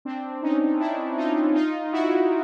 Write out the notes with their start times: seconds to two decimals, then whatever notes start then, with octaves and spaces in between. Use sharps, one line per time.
0.05 C4 D4
0.43 C#4 D#4
0.80 D4 E4
1.18 D#4 F4
1.55 D#4 F4
1.93 E4 F#4